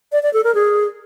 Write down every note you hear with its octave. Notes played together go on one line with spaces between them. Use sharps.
D5
D5
A4
A#4
G#4